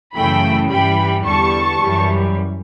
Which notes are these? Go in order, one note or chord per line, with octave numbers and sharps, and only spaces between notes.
F#2 C#3 E3 A3 G5 B5
G2 E3 G3 G5 B5
E2 D3 G3 A5 C#6
F#2 E3 G3